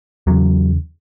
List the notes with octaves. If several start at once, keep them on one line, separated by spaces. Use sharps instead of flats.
E2 C#3 F#3